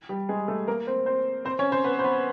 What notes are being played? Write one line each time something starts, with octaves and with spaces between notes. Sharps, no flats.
G3 G4
G#3 G#4
A3 A4
A#3 A#4
C4 C5
C4 C5
C4 C5
C#4 C#5
C4 C5
B3 B4
C5
B3 B4